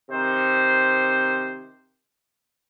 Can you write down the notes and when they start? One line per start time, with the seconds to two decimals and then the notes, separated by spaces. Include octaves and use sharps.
0.11 C3 D#3 C5